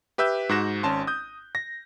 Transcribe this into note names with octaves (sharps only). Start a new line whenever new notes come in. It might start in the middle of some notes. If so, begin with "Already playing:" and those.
G4 B4 E5 E6 G6
G#2 F#4 F#6 A#6 E7
G#1 C#4 A5 C6
D#6 G6
A#6